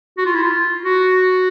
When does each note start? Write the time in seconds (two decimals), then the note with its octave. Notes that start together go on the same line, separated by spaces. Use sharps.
0.18 F#4
0.26 F4
0.34 E4
0.42 F4
0.85 F#4